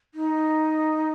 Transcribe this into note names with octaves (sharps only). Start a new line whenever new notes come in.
D#4